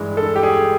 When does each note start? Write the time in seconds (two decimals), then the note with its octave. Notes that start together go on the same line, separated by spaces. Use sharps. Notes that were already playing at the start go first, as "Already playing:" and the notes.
Already playing: G2 E3 G#3
0.17 A4
0.36 G4
0.43 G#4